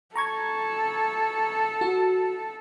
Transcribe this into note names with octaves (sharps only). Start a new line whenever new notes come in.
A4 A#5 C#6 G#6
F#4